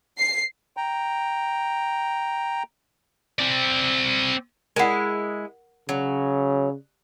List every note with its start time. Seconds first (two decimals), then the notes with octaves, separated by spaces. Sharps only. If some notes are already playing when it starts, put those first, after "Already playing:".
0.18 C7
0.77 G5 A#5
3.39 C4 D5
4.76 G#3 E4 A#4 F#5
5.89 C#3 F#3